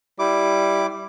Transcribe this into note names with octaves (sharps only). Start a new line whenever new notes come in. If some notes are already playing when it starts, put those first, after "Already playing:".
G3 E4 D6